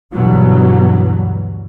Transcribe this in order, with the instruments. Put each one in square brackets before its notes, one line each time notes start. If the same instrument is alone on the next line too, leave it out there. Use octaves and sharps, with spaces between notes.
[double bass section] D2 G2 B2 E3 F#3